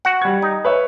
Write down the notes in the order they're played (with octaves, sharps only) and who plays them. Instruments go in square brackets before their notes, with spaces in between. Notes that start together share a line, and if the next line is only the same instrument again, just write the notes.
[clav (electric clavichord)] F#4 F#5
[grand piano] G3 G#6
[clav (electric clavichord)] D#4
[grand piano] B4 C#5 E5